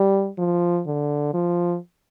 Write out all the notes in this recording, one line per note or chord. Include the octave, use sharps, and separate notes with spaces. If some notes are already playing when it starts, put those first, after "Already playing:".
Already playing: G3
F3
D3
F3